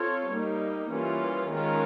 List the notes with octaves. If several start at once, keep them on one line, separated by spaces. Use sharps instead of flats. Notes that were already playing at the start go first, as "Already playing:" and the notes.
Already playing: C4 F4 A4 C#5
G3 A#3 D#4
E3 G3 A#3 C#4 F4
D#3 G#3 C#4 F4 A#4